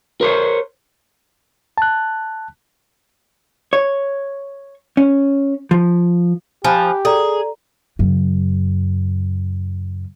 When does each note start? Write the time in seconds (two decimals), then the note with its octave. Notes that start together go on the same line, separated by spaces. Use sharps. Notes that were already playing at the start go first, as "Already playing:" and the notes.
0.21 A#4 C5 C#5
1.78 A5 F#6
3.73 C#5
4.97 C#4
5.71 F3
6.64 F3 G4 G#5 B5 F#6
7.05 G#4 A4 D5 A#5
7.99 F#2 C#3